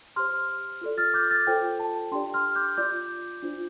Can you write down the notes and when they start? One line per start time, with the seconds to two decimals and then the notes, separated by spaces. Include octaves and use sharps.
0.16 G4 C5 C6 F6
0.81 F4 A4 D5
0.98 F6 A6
1.14 D6 G6
1.31 F6 A6
1.47 F4 A4 C5 G5
1.80 A5
2.12 D4 G4 D5 G5 C6
2.34 C6 F6
2.55 D6 G6
2.77 F4 D5 D6 G6
3.42 D4 F4 C5